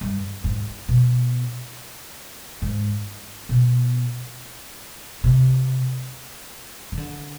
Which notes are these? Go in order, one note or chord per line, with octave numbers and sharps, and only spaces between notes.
G2
G#2
B2
G#2
B2
C3
D#3
D3